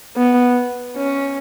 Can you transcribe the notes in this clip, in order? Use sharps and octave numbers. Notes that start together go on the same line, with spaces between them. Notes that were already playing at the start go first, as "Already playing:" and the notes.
B3
C#4